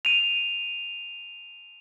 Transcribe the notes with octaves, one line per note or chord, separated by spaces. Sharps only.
D#7 F7